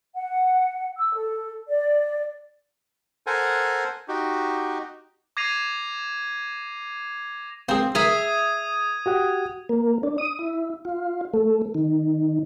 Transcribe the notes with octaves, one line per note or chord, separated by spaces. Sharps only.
F#5
E6
A4
D5
A4 A#4 C5 F#5 G#5
D#4 F#4 G4
D6 G#6 A#6 C7 D#7 F7
A#3 C4 G#4
G#4 A#4 E5 D#6 G#6 D#7
F#4 G4 F#5
A#3
D4
D#6
E4
F4
A3
D#3